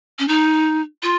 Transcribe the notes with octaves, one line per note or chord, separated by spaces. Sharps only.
C#4
D#4
F4